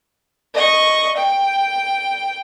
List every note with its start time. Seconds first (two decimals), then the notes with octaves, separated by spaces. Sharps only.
0.54 D#5 C#6
1.17 G5